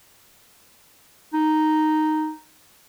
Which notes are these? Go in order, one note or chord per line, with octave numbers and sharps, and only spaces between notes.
D#4